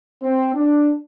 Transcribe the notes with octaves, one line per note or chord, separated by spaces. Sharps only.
C4
D4